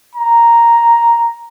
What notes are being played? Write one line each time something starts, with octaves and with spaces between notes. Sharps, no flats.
A#5